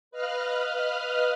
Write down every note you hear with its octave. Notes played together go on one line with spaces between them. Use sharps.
B4 D#5 F5 F6 F#6